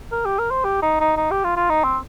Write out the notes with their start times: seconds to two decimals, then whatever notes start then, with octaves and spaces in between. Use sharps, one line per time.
0.12 A#4
0.25 G4
0.39 A#4
0.51 C5
0.64 G4
0.82 D#4
1.00 D#4
1.17 D#4
1.31 G4
1.44 F4
1.57 F4
1.70 D#4
1.84 C4